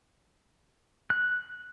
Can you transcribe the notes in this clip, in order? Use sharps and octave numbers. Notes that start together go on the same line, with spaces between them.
F#6